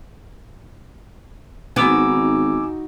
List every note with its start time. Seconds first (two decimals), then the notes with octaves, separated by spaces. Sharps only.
1.76 G#1 B3 D#4 F#4 G#5 D6 E6